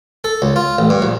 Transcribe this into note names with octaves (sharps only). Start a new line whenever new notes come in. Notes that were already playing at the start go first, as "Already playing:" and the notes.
A4
C#2
F4
A1
G2
A#1